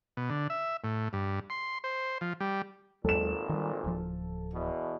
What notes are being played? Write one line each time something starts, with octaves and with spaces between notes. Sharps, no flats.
B2
D3
E5
A2
G2
C6
C5
F3
G3
G#1 D#2 A#2 F#3 G#3 A4 E7
D#3 G3
D1 F3
E2 B2